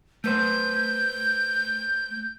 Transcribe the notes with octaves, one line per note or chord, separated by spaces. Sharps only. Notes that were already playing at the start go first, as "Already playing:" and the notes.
A3 B4 C5 G6